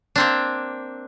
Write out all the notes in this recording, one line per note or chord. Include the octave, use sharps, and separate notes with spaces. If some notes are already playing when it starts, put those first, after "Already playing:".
A#3 C4 D4